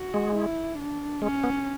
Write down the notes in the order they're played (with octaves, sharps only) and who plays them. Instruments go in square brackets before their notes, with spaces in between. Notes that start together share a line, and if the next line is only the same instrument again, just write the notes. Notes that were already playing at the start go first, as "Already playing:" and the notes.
Already playing: [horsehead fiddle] F#4
[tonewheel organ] G#3
[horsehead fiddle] E4
D4
[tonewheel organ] G#3 [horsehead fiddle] C#4
[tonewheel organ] B3